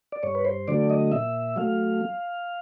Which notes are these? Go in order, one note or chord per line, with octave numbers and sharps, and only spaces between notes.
D5
G2 C#5
B4
C5
D3 F#3 A3 D5
D#5
A#2 E5
F#3 A3 F5